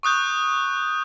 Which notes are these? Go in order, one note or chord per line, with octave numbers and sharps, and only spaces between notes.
C#6 D#6 F#6 G6